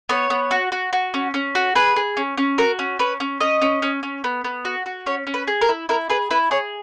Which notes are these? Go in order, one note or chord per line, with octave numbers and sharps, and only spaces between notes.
B3 C#5
B3
F#4
F#4
F#4
C#4
C#4
F#4
G#4 B4
G#4
C#4
C#4
F#4 A#4
C#4
C#4 B4
C#4
C#4 D#5
C#4
C#4
C#4
B3
B3
F#4
F#4
C#4 C#5
C#4
B4
G#4
A#4
E4
E4 A#4
G#4 B4
E4 B4
G#4 C#5